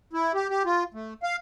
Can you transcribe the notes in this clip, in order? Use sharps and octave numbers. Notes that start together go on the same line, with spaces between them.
E4
G4
G4
F4
A3
F5